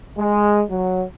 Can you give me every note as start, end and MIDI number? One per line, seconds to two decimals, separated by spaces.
0.17 0.62 56
0.70 1.04 54